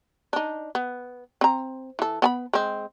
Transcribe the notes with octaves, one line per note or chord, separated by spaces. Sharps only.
D4 D#4
B3
C4 A#5
E3 A4
B3 G#5 B5
G#3 C4